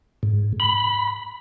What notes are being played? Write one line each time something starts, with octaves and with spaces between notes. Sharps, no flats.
G#2
B5